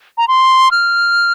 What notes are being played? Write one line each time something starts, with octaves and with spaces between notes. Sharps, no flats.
A#5
C6
F6